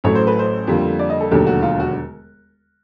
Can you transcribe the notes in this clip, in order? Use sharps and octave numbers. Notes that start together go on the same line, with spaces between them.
A1 A2 F#3 A3 C#5
C5
B4
C5
F2 D3 G3 A#3
D5
D#5
A4
E1 D#2 D3 F#3 A3 G4
F#4
F4
F#4